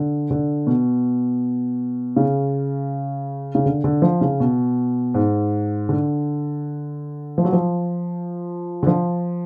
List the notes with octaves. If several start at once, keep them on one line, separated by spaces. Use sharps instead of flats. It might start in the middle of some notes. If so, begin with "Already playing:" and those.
Already playing: D3
D3
B2
C#3
C#3
D3
D3
F3
C#3
B2
G#2
D3
F3
F#3
F3
D3
F3